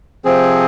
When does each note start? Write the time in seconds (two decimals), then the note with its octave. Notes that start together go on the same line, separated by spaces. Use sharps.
0.25 C3 F3 C4 G#4